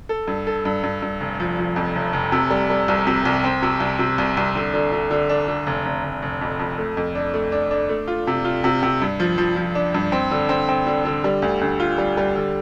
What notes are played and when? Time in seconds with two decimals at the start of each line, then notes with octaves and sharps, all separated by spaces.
0.09 A4
0.28 G2
0.47 A4
0.65 G2
0.83 G2
1.02 G2
1.20 F1
1.40 F3
1.59 F3
1.76 F2
1.96 F1
2.13 F1
2.32 C3
2.50 G3
2.70 G3
2.88 C2
3.07 C3
3.25 C2
3.44 C4
3.62 C3
3.80 C2
3.99 C3
4.18 C2
4.37 C2
4.55 D3
4.74 D3
4.92 D3
5.11 D3
5.29 D4
5.48 D3
5.67 F1
5.85 F1
6.04 F1
6.22 F1
6.41 F2
6.59 F2
6.78 A3
6.97 F2
7.15 D4
7.34 A3
7.52 D4
7.71 D4
7.89 A3
8.08 F4
8.27 C3
8.45 F4
8.64 C3
8.83 C3
9.02 G2
9.20 F3
9.38 F3
9.56 F3
9.75 D4
9.94 G2
10.12 C4
10.31 D3
10.49 C4
10.69 C4
10.87 D3
11.05 D3
11.24 G3
11.42 D2
11.61 D2
11.80 F4
11.98 G3
12.17 G3
12.35 D3